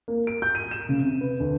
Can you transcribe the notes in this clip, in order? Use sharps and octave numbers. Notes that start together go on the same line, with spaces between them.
A#3
D7
G6
D#7
E7
C#3
C3
B4
D2